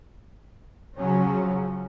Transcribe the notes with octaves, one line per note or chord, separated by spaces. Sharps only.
C#3 F3 F#3 C#4